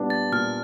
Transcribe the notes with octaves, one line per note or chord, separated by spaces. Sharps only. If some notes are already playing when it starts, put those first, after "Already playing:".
Already playing: A#2 G3 B3 D4
A6
A#2 F6